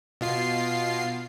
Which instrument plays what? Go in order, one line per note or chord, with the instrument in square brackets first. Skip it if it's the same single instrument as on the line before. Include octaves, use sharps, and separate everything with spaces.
[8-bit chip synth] B2 F4 C7